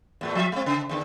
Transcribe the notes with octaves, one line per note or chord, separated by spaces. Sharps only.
E2 A2 A3
F3 E5
G#3 C4
C#3
E2 D3